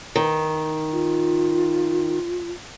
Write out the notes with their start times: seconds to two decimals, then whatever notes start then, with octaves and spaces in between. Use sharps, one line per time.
0.16 D#3
0.92 F4